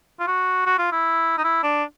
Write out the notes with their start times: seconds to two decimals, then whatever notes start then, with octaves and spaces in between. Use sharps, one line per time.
0.20 F4
0.27 F#4
0.66 F#4
0.78 F4
0.92 E4
1.38 D#4
1.44 E4
1.63 D4